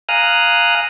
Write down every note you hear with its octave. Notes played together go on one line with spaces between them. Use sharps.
F5 G#5 A#5 D#6 F6 F#6